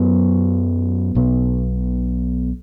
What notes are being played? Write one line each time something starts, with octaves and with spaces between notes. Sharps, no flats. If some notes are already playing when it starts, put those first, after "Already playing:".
Already playing: F#2 F#3 B3
B1 B2 B3